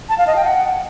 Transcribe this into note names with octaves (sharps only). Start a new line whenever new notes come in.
A5
F5
D#5
G5
F#5